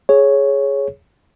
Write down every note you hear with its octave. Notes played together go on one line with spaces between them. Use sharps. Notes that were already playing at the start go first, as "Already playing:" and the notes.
G#4 C#5